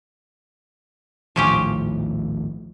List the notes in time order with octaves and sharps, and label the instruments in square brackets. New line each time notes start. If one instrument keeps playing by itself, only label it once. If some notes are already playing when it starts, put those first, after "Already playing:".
[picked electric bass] A#1 D#2 A2 [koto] F3 C#4 G4